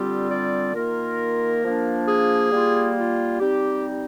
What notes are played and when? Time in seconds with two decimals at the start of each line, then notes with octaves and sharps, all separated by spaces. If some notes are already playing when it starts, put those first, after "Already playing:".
Already playing: D3 G3 C4 F4 G4
0.29 D5
0.74 D#3 A#3 F4 A#4
1.62 F3 A#3 D4
2.06 G#4
2.51 G3 A#3 F4
2.95 F4
3.39 G3 C4 D#4 G4